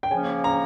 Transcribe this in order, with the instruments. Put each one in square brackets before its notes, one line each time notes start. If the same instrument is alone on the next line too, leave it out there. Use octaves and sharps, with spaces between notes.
[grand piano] G5
[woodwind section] C#3 F3 A#3 C#4 [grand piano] G#5
[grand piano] A#5